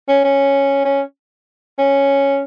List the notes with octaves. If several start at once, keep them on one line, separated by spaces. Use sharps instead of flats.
C#4
C#4
C#4
C#4